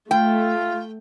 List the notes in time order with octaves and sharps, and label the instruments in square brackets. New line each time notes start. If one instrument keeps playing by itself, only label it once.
[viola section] A3 [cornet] F4 [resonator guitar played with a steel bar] G5